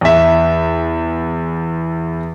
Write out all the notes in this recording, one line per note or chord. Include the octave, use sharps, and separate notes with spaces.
E2 E5